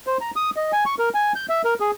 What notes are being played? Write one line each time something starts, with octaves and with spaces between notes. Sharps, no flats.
C5
A#5
D#6
D#5
G#5
C#6
A#4
G#5
G6
E5
A#4
G#4